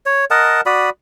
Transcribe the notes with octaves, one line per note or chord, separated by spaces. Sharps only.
C#5
A#4 D#5 F#5 A5
F#4 D5 B5 D#6